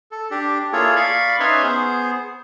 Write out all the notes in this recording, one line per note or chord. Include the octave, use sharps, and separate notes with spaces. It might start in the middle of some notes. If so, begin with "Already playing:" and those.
A4
D4 G4
A#3 E4 F4 G#4 A4 C#5
D5 F5 B5 C#6
C#4 D#4 B4 C#5 E5 C6
B3 G#4 C5